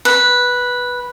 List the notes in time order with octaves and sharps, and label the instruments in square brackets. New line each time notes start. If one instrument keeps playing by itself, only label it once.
[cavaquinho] B4